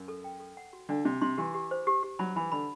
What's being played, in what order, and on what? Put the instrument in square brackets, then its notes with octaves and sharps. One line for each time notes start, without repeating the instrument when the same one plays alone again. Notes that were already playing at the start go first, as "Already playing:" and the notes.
Already playing: [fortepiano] F#2
[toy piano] A4
G5
A4
F#5
F#4
[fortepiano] D3 [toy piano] D4
[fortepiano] C3 [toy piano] D4
[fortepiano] C3 [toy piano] C6
[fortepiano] E3 [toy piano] G4
[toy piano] G4
C5
G4
G4
[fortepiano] F#3 [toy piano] B5
[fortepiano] E3 [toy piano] B5
[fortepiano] D3 [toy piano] B5